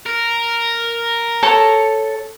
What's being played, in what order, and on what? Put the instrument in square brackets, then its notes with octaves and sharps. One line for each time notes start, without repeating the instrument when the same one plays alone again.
[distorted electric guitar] A#4
[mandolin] A4 C#5 A5